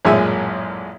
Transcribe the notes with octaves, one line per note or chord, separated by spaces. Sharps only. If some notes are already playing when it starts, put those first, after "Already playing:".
A1 F#2 A#2 G#3 E5 G#5